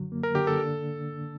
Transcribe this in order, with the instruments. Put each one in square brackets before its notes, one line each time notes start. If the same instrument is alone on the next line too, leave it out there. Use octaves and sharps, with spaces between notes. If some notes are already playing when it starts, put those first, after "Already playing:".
Already playing: [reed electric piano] F#2 D3 F#3
A#3
[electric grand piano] A#4
[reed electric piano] D3 [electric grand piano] G4
[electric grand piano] A4
[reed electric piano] D4